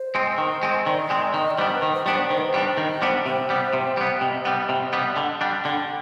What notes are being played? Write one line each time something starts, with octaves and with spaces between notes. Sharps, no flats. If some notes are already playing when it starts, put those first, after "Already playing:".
Already playing: C5
G#3 C4
D#3
G#3 C4
D#3 D5
G#3 C4
D#3 D#5
D5
G3 B3 D4 C5
B4
D#3 C5
C5
G3 B3 D4 C5
D5
D#3 C5
B4
C5
G3 B3 D4
D#3
G3 B3 D4
C3 C5
G3 B3
C3
G3 B3
C3 D#5
G3 B3
C3
G3 B3
D5
D3 D#5
G3 D4
D3 G5